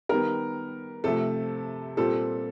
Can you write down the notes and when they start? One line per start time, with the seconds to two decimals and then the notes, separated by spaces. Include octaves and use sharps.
0.09 D#3 G3 B3 A#4
1.04 C3 F3 A3 A4
1.97 A#2 G3 C4 A4